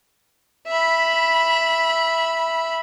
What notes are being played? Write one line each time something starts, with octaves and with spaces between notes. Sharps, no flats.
E5 B5